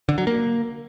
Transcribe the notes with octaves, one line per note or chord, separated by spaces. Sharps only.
D3
F#3
A#3